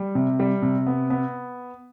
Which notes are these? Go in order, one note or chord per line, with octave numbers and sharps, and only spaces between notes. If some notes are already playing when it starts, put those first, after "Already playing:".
Already playing: G3
C3
G3
C3
B3
B3